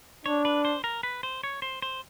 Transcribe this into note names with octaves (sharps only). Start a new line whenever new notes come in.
D4 C#5
B4
C5
A#4
B4
C5
C#5
C5
C5